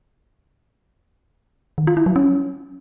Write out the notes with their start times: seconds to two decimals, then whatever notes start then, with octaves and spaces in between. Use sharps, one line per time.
1.78 D#3
1.87 F4
1.97 E4
2.06 F#3
2.16 C#4